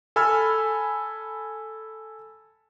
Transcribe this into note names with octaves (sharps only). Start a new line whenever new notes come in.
A4 G#5 B5 E6 F6